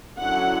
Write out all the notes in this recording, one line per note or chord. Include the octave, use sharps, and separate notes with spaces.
D3 F#3 C#4 E4 F#5